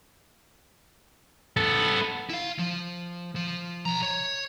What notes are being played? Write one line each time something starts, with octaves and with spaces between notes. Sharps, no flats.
B3 A4
E4 F5
F3
F3
B1 A#5
C#5